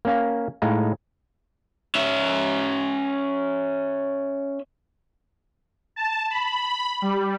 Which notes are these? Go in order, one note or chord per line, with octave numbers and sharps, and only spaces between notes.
A#3 C#4 F5
A2 G#3 D#4 F5
C#4 E5
A5
B5
G3